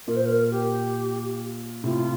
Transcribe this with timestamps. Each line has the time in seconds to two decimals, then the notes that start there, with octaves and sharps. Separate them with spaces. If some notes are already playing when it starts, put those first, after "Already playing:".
0.07 A#2 A#4
0.16 C5
0.25 A#4
0.51 G4
1.83 A2 C3 F4